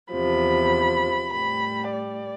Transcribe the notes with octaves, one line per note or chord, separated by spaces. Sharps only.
E2 C3 F3 B5
A2 G3 B5
D5